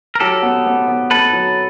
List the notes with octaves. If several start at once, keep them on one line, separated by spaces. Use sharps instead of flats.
A#4
F#3 G4 A4
B3
B3
B3
B3 A4 B4
F#3